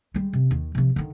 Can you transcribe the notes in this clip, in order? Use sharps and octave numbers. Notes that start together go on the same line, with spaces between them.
G3 G#3
C3
D#2 D#3
C3 F3
D3 D#3